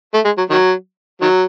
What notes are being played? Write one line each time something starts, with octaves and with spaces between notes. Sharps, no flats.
A3
G#3
F#3
D#3 F#3
D#3 F#3